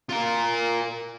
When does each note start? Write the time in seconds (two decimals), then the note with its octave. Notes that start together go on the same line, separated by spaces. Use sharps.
0.10 F4 A#4